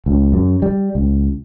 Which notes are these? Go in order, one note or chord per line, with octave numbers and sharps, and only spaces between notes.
C#2
F#2
G3
C#2